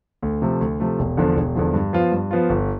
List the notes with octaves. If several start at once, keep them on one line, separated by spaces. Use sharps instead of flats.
D2
C3 F3 A3
D2
C3 F3 A3
E1
E2 D3 F3
E1
E2 D3 F3
G2
F3 B3 F4
G2
F3 B3 F4
G1